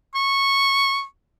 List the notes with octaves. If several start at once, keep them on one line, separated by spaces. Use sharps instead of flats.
C#6